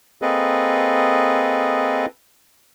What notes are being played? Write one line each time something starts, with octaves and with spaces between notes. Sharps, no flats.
A#3 C4 G#4 A4 B4 D#5